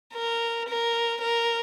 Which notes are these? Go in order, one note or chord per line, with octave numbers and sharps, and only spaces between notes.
A#4
A#4
A#4